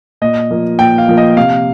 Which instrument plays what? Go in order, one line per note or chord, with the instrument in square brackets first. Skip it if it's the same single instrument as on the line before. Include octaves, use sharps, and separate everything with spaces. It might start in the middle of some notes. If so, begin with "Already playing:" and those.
[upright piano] A#2 [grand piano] D#5
[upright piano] F3 A#3
[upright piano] A#2 [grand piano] G5
[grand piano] F5
[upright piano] F3 A#3
[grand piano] D#5
[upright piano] C3 [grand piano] F5